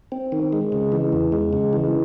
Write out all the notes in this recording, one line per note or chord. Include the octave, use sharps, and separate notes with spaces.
C4
D#3
G#3
C#3
E3
E2
G#3
C#3
E3